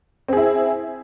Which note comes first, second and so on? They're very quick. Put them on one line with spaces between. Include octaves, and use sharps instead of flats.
C4 G#4 E4